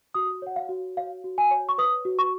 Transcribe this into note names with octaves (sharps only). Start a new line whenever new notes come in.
F#4 D#6
C#5 F#5
F5
F#4
C#5 F5
F#4
G#5
C#5
C#6
B4 D#6
F#4
C#6